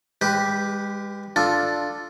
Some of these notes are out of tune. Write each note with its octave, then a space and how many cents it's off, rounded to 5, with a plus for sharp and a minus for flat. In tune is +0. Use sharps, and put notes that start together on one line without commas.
G#3 -40 G4 +0 B4 +0
D4 +0 F4 +0 A4 +0